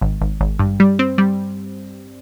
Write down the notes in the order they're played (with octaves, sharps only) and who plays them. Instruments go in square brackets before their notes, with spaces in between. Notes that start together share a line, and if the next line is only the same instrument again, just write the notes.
[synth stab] G#1
G#1
G#1
G2
G3
C4
G3